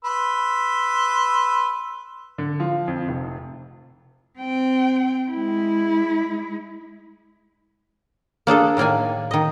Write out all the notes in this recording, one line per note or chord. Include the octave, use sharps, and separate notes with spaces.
B4 C6 E6
D3
F3
F2
F1
C4 G5
G#3 E4
A#3 D4 G#4 A4
A2 D#3 A#3 D5 G#5
D#3 D#5